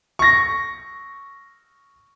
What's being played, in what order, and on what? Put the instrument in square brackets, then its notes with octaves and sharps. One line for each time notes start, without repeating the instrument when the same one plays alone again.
[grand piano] C#6 A#6